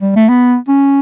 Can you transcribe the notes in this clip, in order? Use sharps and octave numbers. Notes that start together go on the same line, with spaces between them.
G3
A3
B3
C#4